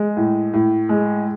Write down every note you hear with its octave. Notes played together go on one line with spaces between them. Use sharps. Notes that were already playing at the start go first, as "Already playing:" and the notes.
Already playing: G#3
A2
A2
G#3